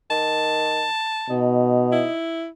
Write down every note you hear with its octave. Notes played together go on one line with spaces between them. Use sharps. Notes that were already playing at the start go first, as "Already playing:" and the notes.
D#3 A5
B2 D#4
E4